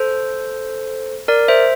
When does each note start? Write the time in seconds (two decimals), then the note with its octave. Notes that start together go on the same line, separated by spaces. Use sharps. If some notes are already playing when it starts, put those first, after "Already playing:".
Already playing: A4 C5
1.28 A#4 D5
1.48 C5 E5